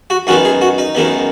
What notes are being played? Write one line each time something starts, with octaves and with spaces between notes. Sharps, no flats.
F#4
F#2 D#3 G#3 B3 F#4
G#4
F#4
D#4
F#2 D#3 G#3 B3